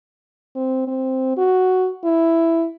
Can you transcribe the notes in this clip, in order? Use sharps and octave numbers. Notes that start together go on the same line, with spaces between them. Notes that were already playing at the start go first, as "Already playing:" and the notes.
C4
C4
F#4
E4